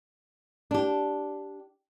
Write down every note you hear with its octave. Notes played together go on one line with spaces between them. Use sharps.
D4 G4